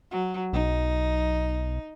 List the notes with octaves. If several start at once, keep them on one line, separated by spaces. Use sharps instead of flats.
F#3
B1 D#4